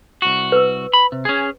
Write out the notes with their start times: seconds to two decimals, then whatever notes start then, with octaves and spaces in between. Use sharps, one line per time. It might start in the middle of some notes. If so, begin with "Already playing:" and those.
0.22 C2 F#4
0.52 B4 E6
0.93 B5
1.12 C3
1.25 C#4 G#4